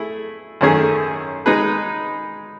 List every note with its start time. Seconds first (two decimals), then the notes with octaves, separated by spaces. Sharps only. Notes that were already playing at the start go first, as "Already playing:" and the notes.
Already playing: A3 E4 G#4
0.61 F#2 D#3 A3 C#4 G#4
1.46 G#3 D#4 G#4 B4